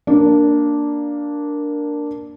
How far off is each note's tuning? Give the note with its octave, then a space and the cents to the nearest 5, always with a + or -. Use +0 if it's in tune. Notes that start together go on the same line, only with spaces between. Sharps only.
A#3 +0 D4 +0